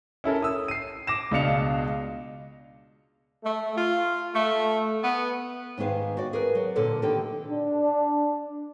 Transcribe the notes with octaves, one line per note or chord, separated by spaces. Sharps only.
C#4 E4 A4 A#4
D#6 E6
C7 D#7
D6 A#6 E7
C#2 B2 D4 F5 C#7 F7
A3
F4
A3
B3
G#2 D#3 B3 G#4 F5
F#4 D5
G#4 A#4 B4
F#3
A#2 D3 A4 D5
D3 D#3 G4
D4